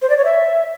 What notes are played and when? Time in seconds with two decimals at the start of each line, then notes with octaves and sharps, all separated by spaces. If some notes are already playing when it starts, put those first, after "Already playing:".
0.02 C5
0.10 D5
0.17 C#5
0.25 E5